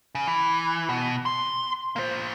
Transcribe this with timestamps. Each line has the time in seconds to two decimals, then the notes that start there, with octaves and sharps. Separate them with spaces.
0.15 C#3
0.27 E3
0.89 B2
1.26 C6
1.96 A#3 C5